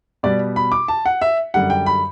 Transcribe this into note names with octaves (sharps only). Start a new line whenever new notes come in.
B2 G3 B3 D5
B5
D6
A5
F#5
E5
F#2 D3 G3 F#5
G5
B5